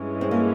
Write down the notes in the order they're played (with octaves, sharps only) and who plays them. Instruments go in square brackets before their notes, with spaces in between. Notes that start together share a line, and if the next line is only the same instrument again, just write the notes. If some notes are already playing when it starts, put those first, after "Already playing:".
Already playing: [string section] G2 E3 G#3 C#4
[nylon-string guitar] C4
A#3